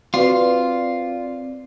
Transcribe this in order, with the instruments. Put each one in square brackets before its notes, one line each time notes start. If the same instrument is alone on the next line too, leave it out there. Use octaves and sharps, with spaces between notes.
[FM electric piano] C4 D5 [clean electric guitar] F4 [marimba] F#4 B4